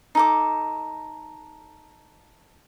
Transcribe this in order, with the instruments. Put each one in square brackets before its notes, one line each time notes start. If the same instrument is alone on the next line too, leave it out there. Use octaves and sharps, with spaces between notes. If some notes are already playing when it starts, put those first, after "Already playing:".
[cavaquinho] D#4 A4 D6